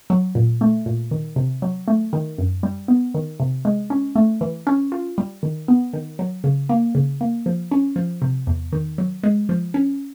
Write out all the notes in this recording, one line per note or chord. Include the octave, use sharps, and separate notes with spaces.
F#3
A#2
A3
A#2
D#3
C3
F#3
A3
D#3
F#2
G3
B3
D#3
C3
G#3
C#4
A3
E3
C#4
F4
G3
D#3
B3
D#3
F#3
C#3
A#3
C#3
A#3
F3
C#4
F3
C3
E2
D#3
F#3
G#3
F3
C#4